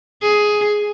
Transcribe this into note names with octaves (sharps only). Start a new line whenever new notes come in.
G#4